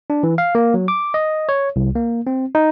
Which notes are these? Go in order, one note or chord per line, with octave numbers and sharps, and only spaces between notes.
D4
E3
F5
A#3
F#3
D6
D#5
C#5
C2
A#3
C4
D#4